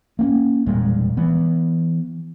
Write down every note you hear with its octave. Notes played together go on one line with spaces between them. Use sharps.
A#3 C4 C#4
E1 A#2 G3 G#3
E3 B3